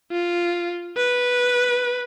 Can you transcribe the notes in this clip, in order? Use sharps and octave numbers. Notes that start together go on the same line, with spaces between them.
F4
B4